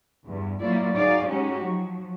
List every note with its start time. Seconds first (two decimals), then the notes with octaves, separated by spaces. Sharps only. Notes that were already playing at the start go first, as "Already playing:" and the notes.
0.24 E2 G2
0.60 F#3 A#3 E4 F4 D5
0.95 D#4 F#4 G#4 D5 F5
1.26 G#3 C#4 D#4 F#4 G4
1.62 F3 F#3